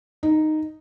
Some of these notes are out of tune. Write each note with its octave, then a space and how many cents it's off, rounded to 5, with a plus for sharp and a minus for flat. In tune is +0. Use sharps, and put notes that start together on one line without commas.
D#4 -5